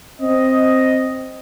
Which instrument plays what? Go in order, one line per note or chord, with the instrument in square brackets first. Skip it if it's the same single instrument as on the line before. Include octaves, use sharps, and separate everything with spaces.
[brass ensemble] C4 D#5